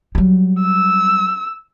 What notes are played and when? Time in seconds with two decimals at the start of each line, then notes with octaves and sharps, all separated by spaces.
0.15 F#3 G3
0.62 E6